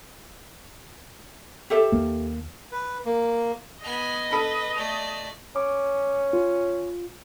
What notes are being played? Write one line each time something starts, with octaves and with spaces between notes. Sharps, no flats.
G4 A4 E5
D#2 A#3
B4
A#3
B3 D#5 G#5
A4 B4 B5
A3 D5
C#4 D6
F4